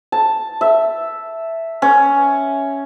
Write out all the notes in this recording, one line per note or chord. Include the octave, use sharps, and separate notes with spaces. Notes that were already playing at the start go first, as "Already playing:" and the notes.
A5
E5
C#4